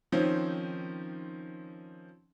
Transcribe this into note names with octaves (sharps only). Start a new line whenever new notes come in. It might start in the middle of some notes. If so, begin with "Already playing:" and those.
D#3 F3 C4 C#4 D#4